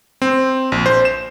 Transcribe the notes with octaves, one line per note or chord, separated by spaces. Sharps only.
C4
A#1
C5
E7